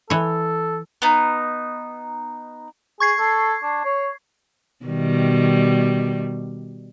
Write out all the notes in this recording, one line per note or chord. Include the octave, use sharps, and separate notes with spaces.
E3 A4 C#5
B3 D#4
G#4 C#6 G#6 C7
A4
D4
C#5
B2 D#3 G3